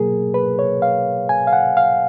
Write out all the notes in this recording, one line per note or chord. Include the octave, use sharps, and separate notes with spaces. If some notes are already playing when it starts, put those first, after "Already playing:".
Already playing: B2 F#3 A#3 G#4 A#4
B4
C#5
F5
G#5
F5
F#5
F5